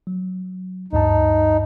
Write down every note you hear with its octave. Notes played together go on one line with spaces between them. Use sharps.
F#3
D2 G2 D#4 A5